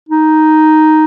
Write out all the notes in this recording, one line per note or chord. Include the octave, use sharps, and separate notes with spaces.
D#4